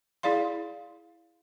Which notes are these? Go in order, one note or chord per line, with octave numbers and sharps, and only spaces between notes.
E4 G#4 D5 F5 C6